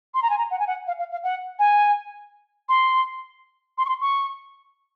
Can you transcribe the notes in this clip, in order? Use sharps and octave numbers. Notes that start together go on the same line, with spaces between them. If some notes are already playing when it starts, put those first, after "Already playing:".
C6
A#5
G#5
A#5
F#5
G#5
F#5
F5
F5
F5
F#5
G#5
C6
C6
C#6
C6
C#6